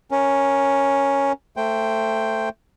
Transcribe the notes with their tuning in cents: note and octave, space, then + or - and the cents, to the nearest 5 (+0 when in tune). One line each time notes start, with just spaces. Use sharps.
C#4 +0 A#4 +0
A3 +15 C5 +0 G5 +0